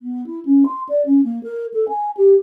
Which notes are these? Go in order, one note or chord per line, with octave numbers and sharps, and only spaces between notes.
B3
E4
C#4
C6
D5
C#4
A#3
A#4
A4
G#5
G4